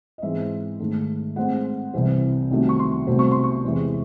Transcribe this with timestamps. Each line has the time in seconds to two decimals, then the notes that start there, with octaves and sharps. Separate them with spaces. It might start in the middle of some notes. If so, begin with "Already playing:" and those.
0.18 D#5
0.22 G#2 E3 G#3 C4 E5
0.80 G#2 D#3 A3
1.36 A2 G#3 C4 F#5
1.94 C2 C3 E3 C4
2.51 C2 C3 D#3 F#3 A3
2.69 C#6
2.79 C6
3.07 C2 C3 F#3 A3 C4
3.19 C#6
3.31 C6
3.44 C#6
3.64 E2 C3 E3 G#3